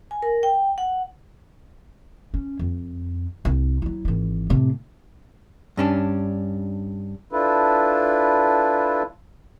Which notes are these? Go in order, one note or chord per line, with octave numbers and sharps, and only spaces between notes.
G#5
A#4
G5
F#5
C#4
F2
C2
F#3 E4
G#1 E3
A2 C3
G2 C#4 D4
D4 E4 F4 A4 B4